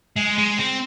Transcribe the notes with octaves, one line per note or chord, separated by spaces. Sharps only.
G#3
G#3
C4